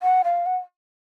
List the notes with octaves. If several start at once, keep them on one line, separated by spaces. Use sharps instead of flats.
F#5
F5
F#5